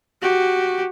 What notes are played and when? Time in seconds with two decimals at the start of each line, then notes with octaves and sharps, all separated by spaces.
0.22 F#4 G4